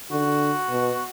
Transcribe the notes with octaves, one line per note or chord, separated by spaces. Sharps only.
D3 F#4
B2